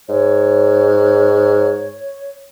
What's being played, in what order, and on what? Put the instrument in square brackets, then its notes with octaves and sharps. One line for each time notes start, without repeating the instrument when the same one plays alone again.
[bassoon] G#2 [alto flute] C#5